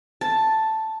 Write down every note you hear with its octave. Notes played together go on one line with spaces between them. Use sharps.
A5